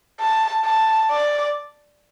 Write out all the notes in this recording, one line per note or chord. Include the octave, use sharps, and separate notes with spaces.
A5
A5
D5